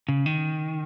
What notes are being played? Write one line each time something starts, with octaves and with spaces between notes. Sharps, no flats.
C#3
D#3